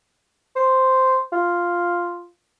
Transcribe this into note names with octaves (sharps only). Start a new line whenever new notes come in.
C5
F4